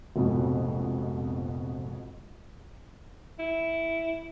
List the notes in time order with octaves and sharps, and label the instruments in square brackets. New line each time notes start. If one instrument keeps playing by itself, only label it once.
[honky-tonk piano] F1 A#1 F2 G#2 B2
[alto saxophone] E4